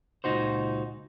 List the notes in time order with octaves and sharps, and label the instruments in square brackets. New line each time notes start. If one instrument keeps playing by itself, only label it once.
[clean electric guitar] C#2 A#2 D#4 F#4 C5